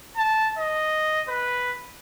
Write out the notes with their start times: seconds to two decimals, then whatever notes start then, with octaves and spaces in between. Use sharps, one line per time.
0.17 A5
0.58 D#5
1.29 B4